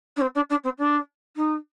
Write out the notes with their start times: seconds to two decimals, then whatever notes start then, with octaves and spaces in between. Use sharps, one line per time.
0.16 D4
0.21 C4
0.35 D4
0.50 D4
0.64 C4
0.78 D4
1.36 D#4